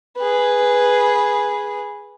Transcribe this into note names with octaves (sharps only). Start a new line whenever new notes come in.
G#4 B4